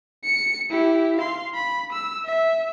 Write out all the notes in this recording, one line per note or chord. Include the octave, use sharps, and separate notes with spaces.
C#7
E4 G4
F5 C6
B5
E6
E5